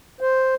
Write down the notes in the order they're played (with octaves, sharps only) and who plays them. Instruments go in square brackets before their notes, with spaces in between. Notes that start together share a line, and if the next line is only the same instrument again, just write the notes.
[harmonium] C5